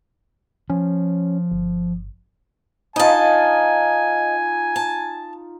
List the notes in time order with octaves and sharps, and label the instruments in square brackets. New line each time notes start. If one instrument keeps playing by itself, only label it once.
[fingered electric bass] F3 [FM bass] C#4
[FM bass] G1
[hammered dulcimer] D#4 F4 [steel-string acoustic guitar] D#5 A5 [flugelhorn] G#5
[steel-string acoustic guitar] A5